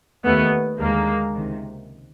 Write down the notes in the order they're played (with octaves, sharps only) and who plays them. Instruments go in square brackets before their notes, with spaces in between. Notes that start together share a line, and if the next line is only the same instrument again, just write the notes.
[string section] D#2 D#3 A3 B3
D#2 D3 G#3 A#3
C#2 C3 D#3